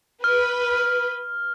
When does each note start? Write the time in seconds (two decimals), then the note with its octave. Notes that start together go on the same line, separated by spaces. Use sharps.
0.24 B4 F6